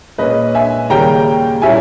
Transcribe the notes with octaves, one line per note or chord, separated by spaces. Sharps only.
A#2 G#3 C#4 B4 D#5
E5 G#5
D#2 C#3 G3 A#3 C#4 G5 A#5
A#2 G3 C#4 E4 E5 G#5